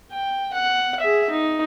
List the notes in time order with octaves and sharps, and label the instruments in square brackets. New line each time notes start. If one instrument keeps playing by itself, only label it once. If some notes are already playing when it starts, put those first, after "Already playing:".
[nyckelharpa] G5
F#5
G#4 E5
D#4